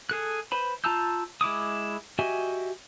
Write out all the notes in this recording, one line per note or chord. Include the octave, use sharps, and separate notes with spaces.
G#4 A4 F#6
B4 C5 B5
F4 A5 A#5 E6 G6
G#3 E4 D6 D#6
F#4 G4 D#5 E5 G#5